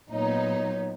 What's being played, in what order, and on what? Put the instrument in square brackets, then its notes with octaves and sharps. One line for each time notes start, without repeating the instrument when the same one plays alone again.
[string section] A#2 F#3 B3 D#4 [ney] C#5